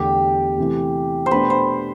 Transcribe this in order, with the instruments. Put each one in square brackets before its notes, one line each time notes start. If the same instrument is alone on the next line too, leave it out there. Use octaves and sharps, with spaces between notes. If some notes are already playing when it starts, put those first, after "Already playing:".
Already playing: [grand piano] E2 D3 A3 [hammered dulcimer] G4
[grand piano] C3 E3 A3
[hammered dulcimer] C5
[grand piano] B2 A3 D4 [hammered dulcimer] B4
[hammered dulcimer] C5